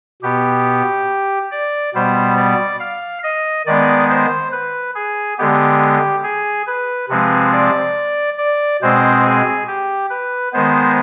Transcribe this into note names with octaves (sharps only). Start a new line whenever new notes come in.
B2 B3 G4
D5
B2 G3 B3 C5
D5
F5
D#5
D#3 G#3 B3 D5
C5
B4
G#4
D3 G#3 B3 G4
G#4
B4
C3 F3 G#3 C4 B4
D5
D5
B2 G#3 C4 C5
G#4
G4
B4
D#3 G#3 B3 C5